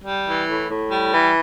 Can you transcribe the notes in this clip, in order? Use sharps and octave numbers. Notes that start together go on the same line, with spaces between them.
G3
E3
A2
A2
G3
E3